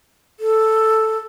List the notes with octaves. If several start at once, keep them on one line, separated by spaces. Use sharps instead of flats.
A4